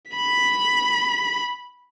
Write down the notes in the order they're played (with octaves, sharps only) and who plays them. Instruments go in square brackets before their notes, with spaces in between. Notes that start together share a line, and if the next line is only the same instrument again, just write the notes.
[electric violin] B5 B6